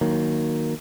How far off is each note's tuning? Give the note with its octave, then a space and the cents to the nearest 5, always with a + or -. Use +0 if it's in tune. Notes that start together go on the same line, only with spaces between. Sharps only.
D#3 +0 F#3 +0 A#3 +0